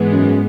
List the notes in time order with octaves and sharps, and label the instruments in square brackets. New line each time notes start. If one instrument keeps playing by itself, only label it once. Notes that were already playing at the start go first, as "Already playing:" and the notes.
Already playing: [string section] G#2 E3 G#3 B3
[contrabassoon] F#2